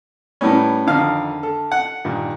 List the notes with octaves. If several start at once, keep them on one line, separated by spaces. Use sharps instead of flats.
A2 G3 A#3 B3 C#4
F2 D3 D#3 F3 F5
A4
F#5
G2 A#2 D#3